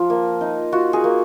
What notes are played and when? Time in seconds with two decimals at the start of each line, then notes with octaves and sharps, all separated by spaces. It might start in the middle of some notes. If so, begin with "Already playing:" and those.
Already playing: F3 F4
0.10 A#3
0.41 D#4
0.72 F4 F#4
0.93 G#4
1.04 A#3